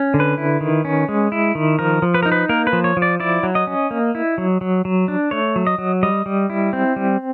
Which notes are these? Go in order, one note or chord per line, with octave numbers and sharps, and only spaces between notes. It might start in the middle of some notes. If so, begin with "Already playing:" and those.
Already playing: C#4
D3
B4
E4
D#3
C#4
G#3
E4
D#3
F3 A#4
F3
B4
D#4 A#4
B4
A#3 A#4
B4
F3
C#5
F3
D5
E4 D5
F#3
D#5
C#4
A#3
E4
F#3
F#3
F#3
D4
A3 C#5
F#3
D#5
F#3
G3 D#5
G3
E4
C4
G3